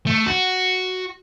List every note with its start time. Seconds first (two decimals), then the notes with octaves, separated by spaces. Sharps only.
0.06 A3
0.26 F#4